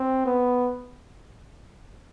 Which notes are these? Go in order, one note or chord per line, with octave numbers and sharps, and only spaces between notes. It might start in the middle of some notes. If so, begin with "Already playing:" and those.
Already playing: C4
B3